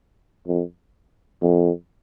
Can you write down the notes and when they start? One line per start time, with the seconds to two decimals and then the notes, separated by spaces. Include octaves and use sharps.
0.47 F2
1.42 F2